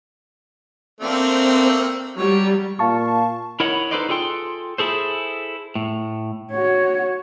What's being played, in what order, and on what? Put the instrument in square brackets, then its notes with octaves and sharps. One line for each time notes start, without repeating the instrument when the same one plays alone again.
[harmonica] A3 A#3 D4 [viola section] C4
[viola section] F#3 G3 [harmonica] C#5
[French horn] A#2 [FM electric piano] F5 A5 C#6
[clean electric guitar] E4 A#4 C#5 D#5 F#5
D#4 A4 B4 C5 D5 D#5
F4 G#4 A4 G5 C6
E4 G#4 A4 C5
A2
[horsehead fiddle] F#4 C#5